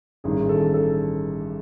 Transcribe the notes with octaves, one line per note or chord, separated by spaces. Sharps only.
A1 G2 D#3 G#4
A4
A4